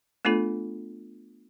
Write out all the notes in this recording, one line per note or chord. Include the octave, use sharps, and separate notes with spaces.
A3 B3 D4 F4 A4